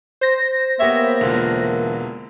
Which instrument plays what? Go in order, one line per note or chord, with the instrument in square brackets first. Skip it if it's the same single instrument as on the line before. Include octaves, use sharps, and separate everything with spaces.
[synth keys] C5 A#6
[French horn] A#3 [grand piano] B3 G4 C#5 [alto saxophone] E5
[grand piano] E1 D3 F4 [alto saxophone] E3